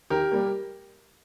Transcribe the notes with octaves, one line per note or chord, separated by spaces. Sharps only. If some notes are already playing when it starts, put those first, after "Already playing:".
D#3 G4 A#4
G3 A#3